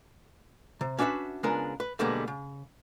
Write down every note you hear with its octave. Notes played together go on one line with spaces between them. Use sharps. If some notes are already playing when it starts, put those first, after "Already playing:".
C3
C#4 D4 F#4 B4 E5
C#3 G#3 B3 D4 F4 A#4
B4
B1 D3 G3 G#3 A#3 B3
C#3